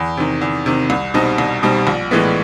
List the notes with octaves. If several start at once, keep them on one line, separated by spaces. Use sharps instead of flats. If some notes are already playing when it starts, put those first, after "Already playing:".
Already playing: E2
C3 D#3
E2
C3 D#3
C2
B2 G3 C4 D#4
C2
B2 G3 C4 D#4
A#1
A2 E3 G#3 B3